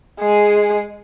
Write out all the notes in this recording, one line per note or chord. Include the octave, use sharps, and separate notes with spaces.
G#3 G#4